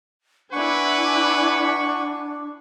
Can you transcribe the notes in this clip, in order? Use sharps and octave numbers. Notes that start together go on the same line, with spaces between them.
D4 E4 B4 F#5 G#5 C#6